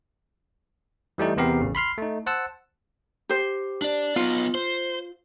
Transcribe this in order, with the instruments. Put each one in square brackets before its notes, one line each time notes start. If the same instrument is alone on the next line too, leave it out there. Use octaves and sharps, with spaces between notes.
[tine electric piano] E3 G3 A3 D#4
E2 C3 B3 G4 A#4 C7
A1 C#3
B5 C6 F6 C7
A3 D#4
C5 F#5 A5 E6
[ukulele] G4 C5
[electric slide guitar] D4 D5
[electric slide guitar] B3 C#4 D#4 [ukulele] F4
[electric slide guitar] C5